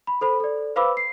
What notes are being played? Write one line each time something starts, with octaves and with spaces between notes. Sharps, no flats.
B5
A4 C5 B5
A4 D5
B4 C5 F5 B5 D6 E6
C7